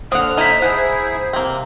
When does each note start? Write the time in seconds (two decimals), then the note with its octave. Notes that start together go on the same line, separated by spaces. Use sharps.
0.12 D3 A#3 C4 F#5 D#6 F6
0.37 D#4 E4 C5 D#5 A#5 B6
0.62 E4 G#4 C5 F#5
1.33 C3 A#3 C4